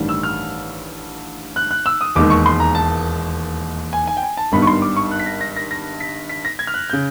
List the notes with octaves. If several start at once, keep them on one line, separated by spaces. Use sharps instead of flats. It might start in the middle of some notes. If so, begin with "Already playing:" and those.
Already playing: A1 G2 D#3 G3
E6
F6
F#6
F#6
E6
D#6
E1 D#2 D#3 G#3 D6
C#6
C6
A#5
A5
G#5
G#5
G5
G#5
A5
G#1 G2 D#3 G3 B3 B5
C#6
C6
D6
C#6
F#6
B6
A#6
A#6
A#6
A#6
B6
B6
A#6
G#6
F6
F#6
C#3 G6